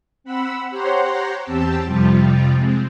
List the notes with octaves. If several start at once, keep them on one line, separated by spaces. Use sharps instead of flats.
C4 F#5 B5 E6
G4 C5 C#5 F#5 A#5 C6
E2 C4 G4 A5 E6
F2 C3 F3 G3 F4
G#3 C4